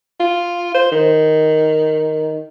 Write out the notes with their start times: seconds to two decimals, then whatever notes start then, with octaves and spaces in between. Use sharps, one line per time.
0.20 F4
0.74 C5
0.92 D#3